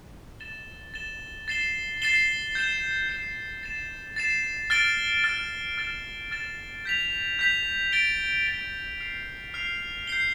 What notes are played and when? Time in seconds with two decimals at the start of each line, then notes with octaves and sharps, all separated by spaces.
0.40 A6 E7 G7
0.94 A6 E7 G7
1.48 A6 C7 E7 G7
2.02 A6 C7 E7 G7
2.55 G6 C7 E7 G7
3.09 G6 C7 E7 G7
3.63 A6 C7 E7
4.16 A6 C7 E7
4.70 F6 A6 D7 G7
5.24 F6 A6 D7 G7
5.78 F6 A6 E7 G7
6.31 F6 A6 E7 G7
6.85 G6 B6 F7
7.39 G6 B6 F7
7.92 A6 D7 G7
8.47 A6 D7 G7
9.00 F6 C7 F7
9.54 F6 C7 F7
10.07 G6 C7 G7